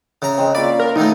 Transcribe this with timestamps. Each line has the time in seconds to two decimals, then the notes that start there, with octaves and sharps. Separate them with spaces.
0.22 C#3 E5 A#5
0.38 G#3 C4
0.55 A#3 C#4 F4 D5 B5
0.79 F4 A#4
0.96 B1 D#3 A3 D#4